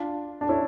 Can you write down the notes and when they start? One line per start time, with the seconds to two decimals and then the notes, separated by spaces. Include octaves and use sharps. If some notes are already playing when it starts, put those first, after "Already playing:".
Already playing: D4 F4
0.41 D4
0.49 C#4 E4